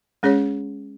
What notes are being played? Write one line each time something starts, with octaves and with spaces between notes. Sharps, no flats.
G#3 C#4 G#4 C#5